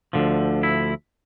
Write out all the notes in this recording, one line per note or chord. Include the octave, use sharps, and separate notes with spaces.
D2 D3 F3
E4